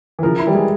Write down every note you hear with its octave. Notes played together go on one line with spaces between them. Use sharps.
E3
C#3 F3 A#4
E4
E3 G3
G#3